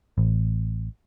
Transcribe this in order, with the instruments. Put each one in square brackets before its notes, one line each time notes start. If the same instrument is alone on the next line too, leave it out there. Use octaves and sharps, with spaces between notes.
[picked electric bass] A1